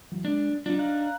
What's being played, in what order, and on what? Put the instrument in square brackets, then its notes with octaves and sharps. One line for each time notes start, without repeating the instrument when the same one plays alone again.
[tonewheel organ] E3 F#3
[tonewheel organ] G#3 [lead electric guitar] D4
[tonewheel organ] F#3 F4 [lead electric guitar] D4 D#4
[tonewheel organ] F5 A#5 F#6